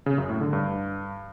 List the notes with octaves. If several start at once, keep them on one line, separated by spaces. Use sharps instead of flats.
C#3
F#2
A2
D3
G2